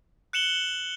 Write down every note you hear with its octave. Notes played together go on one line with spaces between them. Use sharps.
F#6 C#7 E7 F#7 G7